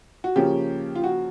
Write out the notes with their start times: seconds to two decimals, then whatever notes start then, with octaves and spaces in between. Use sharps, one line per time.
0.24 F#4
0.36 C#3 F3 A#3 C#4 G4
0.95 F4
1.04 F#4